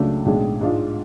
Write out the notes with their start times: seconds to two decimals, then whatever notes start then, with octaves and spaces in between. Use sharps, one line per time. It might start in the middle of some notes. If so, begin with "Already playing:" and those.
Already playing: C#2 C#3 F#3 A3 D4
0.25 B1 A2 G#3 D4 G#4
0.61 G#2 G#3 D4 F4